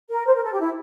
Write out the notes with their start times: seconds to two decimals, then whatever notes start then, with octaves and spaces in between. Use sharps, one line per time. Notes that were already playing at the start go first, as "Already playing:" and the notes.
0.10 A#4
0.27 C5
0.35 A#4
0.43 A4
0.52 G4
0.60 E4